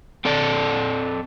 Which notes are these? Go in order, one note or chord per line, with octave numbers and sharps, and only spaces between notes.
C4 A4 D5 A5